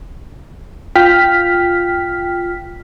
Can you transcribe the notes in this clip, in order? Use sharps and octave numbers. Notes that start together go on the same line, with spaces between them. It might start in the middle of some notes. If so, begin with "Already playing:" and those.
F4 G5 F6 B6